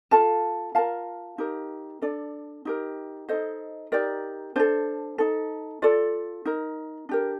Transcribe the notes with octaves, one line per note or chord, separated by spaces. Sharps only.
F4 A4 F5 A5
F4 A#4 F5 A5
D#4 G4 A#4
D4 A4 D5
D#4 G4 A#4
D#4 A4 C5 D#5
D#4 G4 A#4 D5
D4 A4 C5
D#4 A4
F4 A4 D5
D#4 A#4
D4 G4 A#4